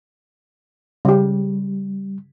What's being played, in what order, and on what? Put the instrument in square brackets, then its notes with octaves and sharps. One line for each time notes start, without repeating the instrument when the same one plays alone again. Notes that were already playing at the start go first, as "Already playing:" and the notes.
[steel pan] C#3 G4 [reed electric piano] G3